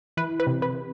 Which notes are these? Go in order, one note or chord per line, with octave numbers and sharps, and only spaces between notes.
E3 B4
B4
C3
B4